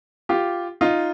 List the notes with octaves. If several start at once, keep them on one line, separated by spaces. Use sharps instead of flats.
F4 G4
D#4 F4